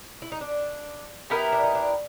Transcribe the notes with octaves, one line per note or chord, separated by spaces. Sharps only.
E4
D#4
D4
B3 D#4 E4 G4 A#4
D4
D#4
D4